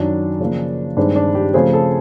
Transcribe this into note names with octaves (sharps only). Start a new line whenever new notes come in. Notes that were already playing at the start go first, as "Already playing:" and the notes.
Already playing: F#2 D#3 F#3 D4
C#3 F3 A#3
G2 D#3 G#3 C4 D4
D4
G4
C#3 F3 A3 C4 G#4
A4